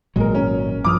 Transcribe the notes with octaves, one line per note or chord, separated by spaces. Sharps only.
G#1 A#2 F#3 G#3 A#4
C#4 A#4
G2 F3 D6 D#6 F6